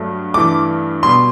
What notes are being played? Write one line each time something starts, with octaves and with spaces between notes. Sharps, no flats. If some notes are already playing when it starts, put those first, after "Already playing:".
Already playing: G2 F#3 A3
G2 E3 A3 D6
B2 G3 C6